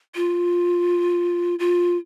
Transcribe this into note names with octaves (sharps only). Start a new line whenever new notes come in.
F4
F4